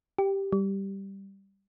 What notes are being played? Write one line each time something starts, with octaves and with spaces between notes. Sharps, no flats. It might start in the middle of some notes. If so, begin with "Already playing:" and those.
G4
G3